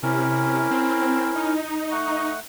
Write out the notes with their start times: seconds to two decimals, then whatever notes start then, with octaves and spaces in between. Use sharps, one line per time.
0.03 C3 C#4 E4 A#4
0.71 C4
1.35 D#4
1.92 A3 F#5 C#6